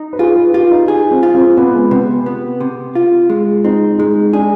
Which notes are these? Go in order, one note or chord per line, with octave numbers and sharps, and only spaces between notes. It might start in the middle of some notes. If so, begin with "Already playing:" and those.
Already playing: D#4
B4
F4 G#4
B4
F4 G4
D#4
G#4
C4
F4
C4
C3 B3
G#3
C3 B3
B3
C3
F4
G#3
C4 D#4
G#3 D#4
D4 G#4